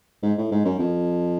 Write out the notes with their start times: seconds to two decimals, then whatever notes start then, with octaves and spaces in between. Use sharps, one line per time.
0.23 G#2
0.38 A2
0.51 G#2
0.65 F#2
0.79 F2